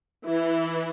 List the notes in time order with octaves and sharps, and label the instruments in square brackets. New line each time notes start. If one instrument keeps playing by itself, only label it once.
[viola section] E3 E4